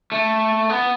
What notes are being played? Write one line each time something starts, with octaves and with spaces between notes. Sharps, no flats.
A3
B3